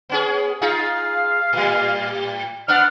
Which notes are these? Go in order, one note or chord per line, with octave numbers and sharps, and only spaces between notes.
B3 C#4 G#4
D#4 F4 G#4 F5
A2 G3
B3 D4 F#5 F6